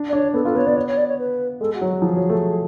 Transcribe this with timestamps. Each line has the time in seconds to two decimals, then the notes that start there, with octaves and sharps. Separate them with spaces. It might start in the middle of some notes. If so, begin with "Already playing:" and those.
Already playing: D4
0.09 D5
0.13 D4 C#5
0.34 B3 A4
0.45 F4 A4
0.55 B3 C#5
0.66 B3 D5
0.76 C#5
0.86 C#5
0.97 D5
1.08 C#5
1.18 B4
1.61 G#3 A4
1.74 F#4
1.81 F#3
1.88 F#4
2.02 F3 G#4
2.16 F#3
2.30 A3